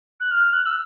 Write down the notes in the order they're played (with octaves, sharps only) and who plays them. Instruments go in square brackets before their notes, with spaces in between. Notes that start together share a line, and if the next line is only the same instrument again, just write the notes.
[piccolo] F#6
F6
F#6
E6